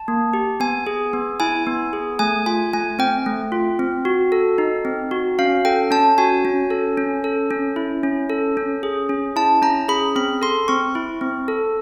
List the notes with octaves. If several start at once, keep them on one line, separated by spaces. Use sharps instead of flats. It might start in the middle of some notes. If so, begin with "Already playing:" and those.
Already playing: A5
A#3
G4
B3 G#5
G#4
B3
E4 G#5
B3
G#4
A3 G#5
F4 G#5
A3 G#5
C4 G5
A3
F4
C4
F#4
A4
D#4
C4
F#4
C#4 F5
A4 G5
C#4 A5
F#4 G#5
C#4
A4
C#4
A4
C#4
E4
C#4
A4
C#4
G#4
C#4
E4 A5
C#4 A#5
G#4 B5
C4 B5
A4 C6
C4 C#6
E4
C4
A4